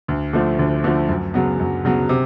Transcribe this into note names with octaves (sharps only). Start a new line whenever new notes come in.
D2
D3 F3 A3
D2
D3 F3 A3
F#2
C#3 F#3 B3
F#2
C#3 F#3 B3
C3